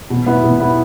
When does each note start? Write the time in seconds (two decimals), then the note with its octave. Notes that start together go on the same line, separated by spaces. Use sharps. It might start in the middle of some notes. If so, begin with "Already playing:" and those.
0.10 B2
0.26 B3 E4
0.43 B2
0.60 B3 E4